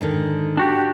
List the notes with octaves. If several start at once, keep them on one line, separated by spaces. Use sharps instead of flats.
G#2 D3 D#3
D4 F#4 G4 G5